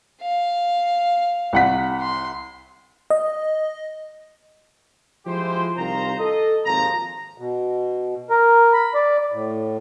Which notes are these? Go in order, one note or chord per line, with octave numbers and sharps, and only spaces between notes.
F5
C2 F#5 B6
C6
D#5
F3 G#3 E4 G4 C5
C2 D#3 F4 C5 A#5
A4 D#5
G#1 D#2 F3 A#5
B2
A#4
B5
D5
A2